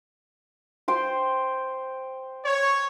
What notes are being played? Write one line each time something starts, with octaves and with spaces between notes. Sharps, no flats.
C5 G5 C6
C#5